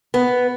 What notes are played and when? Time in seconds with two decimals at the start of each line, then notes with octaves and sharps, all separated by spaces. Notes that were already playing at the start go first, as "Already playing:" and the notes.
0.14 B3